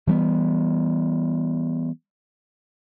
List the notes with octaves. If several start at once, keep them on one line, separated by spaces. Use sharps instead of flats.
E3 G3 A#3 B3